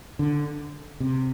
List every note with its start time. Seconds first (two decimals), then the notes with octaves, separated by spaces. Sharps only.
0.19 D3
1.00 C3